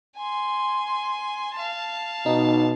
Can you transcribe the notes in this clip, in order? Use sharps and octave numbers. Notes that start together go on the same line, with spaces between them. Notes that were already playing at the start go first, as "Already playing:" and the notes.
G#5 C6
F5 A5
B2 D#4